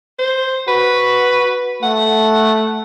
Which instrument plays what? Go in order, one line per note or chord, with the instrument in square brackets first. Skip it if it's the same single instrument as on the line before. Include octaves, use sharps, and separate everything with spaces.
[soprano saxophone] C5
[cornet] F#4 [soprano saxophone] B4
[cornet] A3 [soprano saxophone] F#5